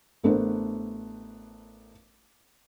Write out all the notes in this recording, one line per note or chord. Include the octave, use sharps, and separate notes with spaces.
A1 A3 B3 D4 A#4 C5